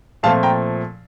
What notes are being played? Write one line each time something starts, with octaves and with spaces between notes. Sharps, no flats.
A#2 F3 A3 C4 F5 A5
G5 A#5